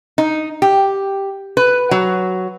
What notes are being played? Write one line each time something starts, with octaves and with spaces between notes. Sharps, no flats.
D#4
G4
B4
F#3